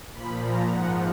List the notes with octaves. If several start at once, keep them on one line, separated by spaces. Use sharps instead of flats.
A#2 F3 B5
A#5
G#2 F3 F#5